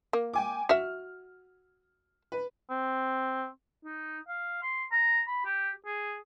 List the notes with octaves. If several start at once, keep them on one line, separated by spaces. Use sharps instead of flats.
A#3
G5 G#5 D6
F#4 E5 F6
B4
C4
D#4
F5
C6
A#5
B5
G4
G#4